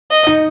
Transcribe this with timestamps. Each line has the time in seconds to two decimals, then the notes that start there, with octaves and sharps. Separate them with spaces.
0.11 D#5
0.27 D#4